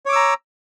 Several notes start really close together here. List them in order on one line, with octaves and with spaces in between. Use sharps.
C#5 D6 E6 A#5